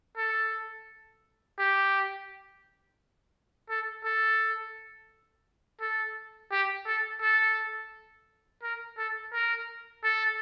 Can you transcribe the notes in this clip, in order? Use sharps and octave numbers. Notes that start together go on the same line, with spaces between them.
A4
G4
A4
A4
A4
G4
A4
A4
A#4
A4
A#4
A4